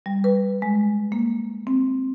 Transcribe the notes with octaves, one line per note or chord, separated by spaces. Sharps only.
G3
B4
G#3
A#3
C4